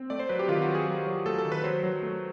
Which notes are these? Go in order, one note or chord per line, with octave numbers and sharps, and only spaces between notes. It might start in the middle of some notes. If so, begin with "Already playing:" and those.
Already playing: C4
A3 D5
C5
F#3 B4
G4
D#3 F4
F#4
F#3
G#4
F#3
F#3
A3 A4
A4
D#3
B4
F#3 C5
F#3
A3